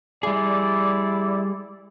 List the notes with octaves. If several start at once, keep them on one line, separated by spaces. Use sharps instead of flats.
G3 E4 G#4 D5